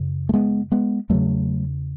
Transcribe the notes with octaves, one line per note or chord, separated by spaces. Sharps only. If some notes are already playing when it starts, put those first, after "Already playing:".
Already playing: F#2 C#3
A3
G#3 B3
G#3 B3
E2 C#3 F#3 A3